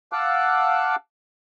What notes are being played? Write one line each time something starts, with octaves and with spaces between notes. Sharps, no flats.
F5 F#5 A5 D6 E6 F#6